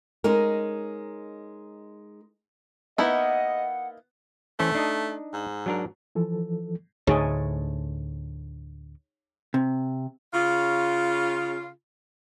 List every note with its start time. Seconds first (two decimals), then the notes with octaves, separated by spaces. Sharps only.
0.24 G#3 C#4 D#4 A#4
2.98 A#3 B3 D#4 E4 D#5 F#5
4.59 E3 A3 C#4 C5
4.75 D4 D#4 D#5
5.33 G#2
5.66 F#3 D4 A#4
6.15 E3 F3 A4
7.07 D2 A2 D3 D#4 G#4 C#5
9.54 C3
10.34 C#3 F4